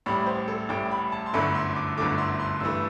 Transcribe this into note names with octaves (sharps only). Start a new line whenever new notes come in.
A1 A2 G3 B5
C5
A4
A1 A2 G3 G5
B5
A5
C6
G1 F#2 D3 A3 E4 B5
C6
D6
G1 F#2 D3 A3 E4 D6
C6
C6
G2 E3 A3 E6